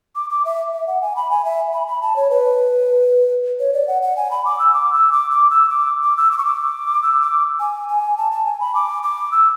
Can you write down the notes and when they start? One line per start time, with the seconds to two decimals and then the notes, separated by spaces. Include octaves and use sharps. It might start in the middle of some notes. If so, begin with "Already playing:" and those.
0.16 D6
0.30 D6
0.45 E5
0.73 E5
0.87 F#5
1.02 G#5
1.16 B5
1.30 G#5
1.45 E5
1.73 B5
1.87 B5
2.02 A5
2.16 C#5
2.30 B4
3.59 C#5
3.73 D5
3.88 F#5
4.02 F#5
4.17 G#5
4.31 B5
4.45 D6
4.59 E6
4.74 D6
4.93 E6
5.12 D6
5.31 D6
5.50 E6
5.69 D6
6.03 D6
6.17 E6
6.31 D6
6.38 C#6
6.45 D6
7.03 E6
7.22 D6
7.60 G#5
7.89 G#5
8.17 A5
8.32 A5
8.46 G#5
8.60 B5
8.75 D6
9.03 D6
9.32 E6